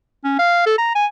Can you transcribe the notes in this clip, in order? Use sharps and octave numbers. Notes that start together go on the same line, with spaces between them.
C#4
F5
A4
A#5
G#5